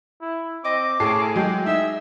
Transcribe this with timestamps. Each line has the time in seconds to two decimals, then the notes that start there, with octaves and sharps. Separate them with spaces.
0.21 E4
0.64 C4 D#5 D6
1.00 A2 C#4 G#4 A4 C7
1.36 F#3 G#3 G5
1.66 D#4 G#4 E5 E6